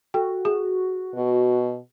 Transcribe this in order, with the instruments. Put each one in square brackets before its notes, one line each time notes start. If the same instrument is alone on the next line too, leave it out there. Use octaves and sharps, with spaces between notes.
[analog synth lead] F#4 [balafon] A4 G5
[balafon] G#4
[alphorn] B2